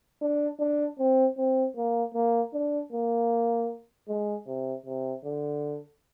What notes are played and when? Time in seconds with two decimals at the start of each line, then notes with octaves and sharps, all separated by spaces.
0.21 D4
0.60 D4
0.98 C4
1.37 C4
1.76 A#3
2.14 A#3
2.54 D4
2.92 A#3
4.08 G#3
4.46 C3
4.86 C3
5.25 D3